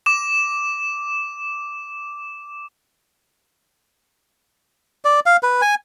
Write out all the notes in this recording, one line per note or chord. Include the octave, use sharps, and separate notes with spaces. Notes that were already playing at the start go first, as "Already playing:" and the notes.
D6 E7
D5
F5
B4
G#5